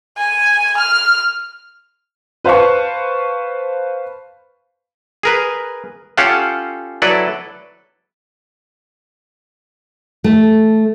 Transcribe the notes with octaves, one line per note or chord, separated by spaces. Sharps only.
G#5
F6
B4 C5 F5 A5 C#6
G#4 A#4 B4
C#4 F4 G4 A4 F5 F#5
F#3 E4 A4 B4 D5
A3